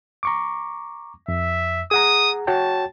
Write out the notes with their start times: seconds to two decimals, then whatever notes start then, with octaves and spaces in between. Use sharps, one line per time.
0.23 A#5 C#6 D6
1.28 F2 E5
1.91 G#4 F#5 A#5 D#6
2.47 F#4 C#5 G5 A5